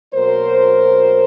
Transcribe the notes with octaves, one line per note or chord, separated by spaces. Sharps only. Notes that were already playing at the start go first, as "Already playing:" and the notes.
B2 F#3 A#3 A#4 C5